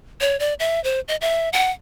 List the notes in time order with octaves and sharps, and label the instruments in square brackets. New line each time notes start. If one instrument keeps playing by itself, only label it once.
[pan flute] C#5
D5
E5
C5
D#5
E5
F#5